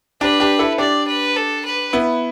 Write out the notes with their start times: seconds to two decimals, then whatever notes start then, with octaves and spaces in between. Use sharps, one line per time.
0.21 D4 G4 B4
0.40 D4 G4
0.59 E4 A4
0.78 D4 G4 D5
1.07 B4
1.36 A4
1.65 B4
1.93 B3 E4